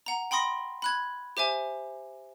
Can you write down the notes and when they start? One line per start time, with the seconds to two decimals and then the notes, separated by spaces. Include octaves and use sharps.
0.06 F#5 A#5
0.31 G5 B5 C6 D#6 A#6
0.82 B5 F#6 G#6
1.37 G4 C5 E5 G#5